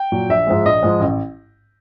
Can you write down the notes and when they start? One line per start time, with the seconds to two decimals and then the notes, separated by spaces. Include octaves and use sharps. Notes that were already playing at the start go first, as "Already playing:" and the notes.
Already playing: G5
0.12 A#2 F#3
0.29 A#1 E5
0.47 G#2 F3 G#3
0.65 A#1 D#5
0.82 G#2 F3 G#3
1.00 A1